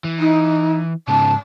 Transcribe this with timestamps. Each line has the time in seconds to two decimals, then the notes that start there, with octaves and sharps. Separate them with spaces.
0.04 E3
0.19 D#4
1.08 G#2 C#3 A5